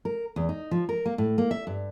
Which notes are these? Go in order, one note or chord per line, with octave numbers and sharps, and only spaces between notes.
A#4
E2
D#4
F3
A#4
A#3
A2
A#3
E5
G2